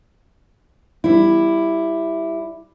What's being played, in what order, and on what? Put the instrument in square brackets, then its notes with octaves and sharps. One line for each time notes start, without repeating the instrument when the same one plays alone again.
[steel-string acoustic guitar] G3 E4